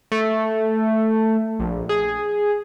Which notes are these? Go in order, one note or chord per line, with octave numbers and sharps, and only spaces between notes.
A3
A#1
G#4